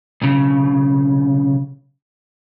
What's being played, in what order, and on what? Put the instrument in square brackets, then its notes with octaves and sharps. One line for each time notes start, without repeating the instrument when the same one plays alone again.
[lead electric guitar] B1 C#3